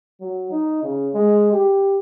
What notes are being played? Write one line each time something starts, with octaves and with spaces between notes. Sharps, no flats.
F#3
D#4
C#3
G#3
G4